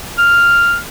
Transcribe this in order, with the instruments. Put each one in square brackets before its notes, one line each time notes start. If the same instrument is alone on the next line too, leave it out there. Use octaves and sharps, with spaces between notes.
[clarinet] F6